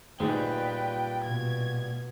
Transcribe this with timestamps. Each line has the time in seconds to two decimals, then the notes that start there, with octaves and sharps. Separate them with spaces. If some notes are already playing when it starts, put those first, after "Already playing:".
0.20 D2 A#2 G3 G#3 D#4 G#4 B4 G5
1.25 B2 G#6